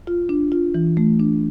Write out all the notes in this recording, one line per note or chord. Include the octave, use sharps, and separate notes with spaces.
F4
D4
F4
E3
A3
D4